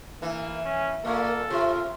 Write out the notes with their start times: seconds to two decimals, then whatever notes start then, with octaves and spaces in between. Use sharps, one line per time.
0.22 E3 A#3
0.65 C#4
1.05 A#2 A#3 A4
1.50 C3 F4